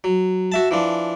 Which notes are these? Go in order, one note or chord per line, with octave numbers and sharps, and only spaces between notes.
F#3
F#4 E5 A5
E3 F3 D4